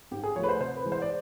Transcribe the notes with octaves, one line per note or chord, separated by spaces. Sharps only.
G#2 G4
G#4
F3 A3 C#5
B4
C5
C3 C5
B4
E3 G#3
C5
D5